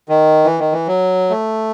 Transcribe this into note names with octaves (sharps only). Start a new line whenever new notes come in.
D#3
E3
D#3
E3
F#3
A3